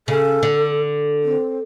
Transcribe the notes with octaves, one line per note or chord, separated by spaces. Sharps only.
C#3 A4
D3
C4